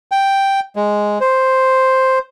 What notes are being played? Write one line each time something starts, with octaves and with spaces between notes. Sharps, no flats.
G5
G#3
C5